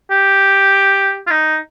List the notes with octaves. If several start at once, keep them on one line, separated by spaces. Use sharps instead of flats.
G4
F4
D#4